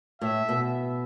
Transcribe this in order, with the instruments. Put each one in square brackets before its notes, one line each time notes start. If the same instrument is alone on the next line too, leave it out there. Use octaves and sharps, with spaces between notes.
[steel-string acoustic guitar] A2 [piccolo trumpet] E5
[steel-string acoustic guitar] B2